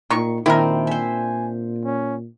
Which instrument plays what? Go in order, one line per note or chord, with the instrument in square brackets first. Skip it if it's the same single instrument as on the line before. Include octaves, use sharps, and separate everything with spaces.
[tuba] A#2 [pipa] D#3 C#6
[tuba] A#2 [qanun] D#3 C4 D4 [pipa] E4 A#4
[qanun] C5 E5 [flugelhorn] G#5
[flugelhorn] C#4